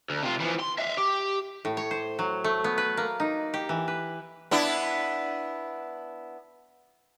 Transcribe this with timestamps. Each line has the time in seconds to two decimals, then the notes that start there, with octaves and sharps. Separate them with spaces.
0.10 D2
0.23 C3 F4
0.40 E3 F3
0.60 C6
0.79 E5 F5
0.98 G4
1.65 A2
1.77 C#5
1.91 C5
2.19 F#3
2.44 A3
2.64 B3
2.78 B4
2.97 A#3
3.20 D#4
3.54 G4
3.69 E3
3.88 B4
4.51 B3 D4 E4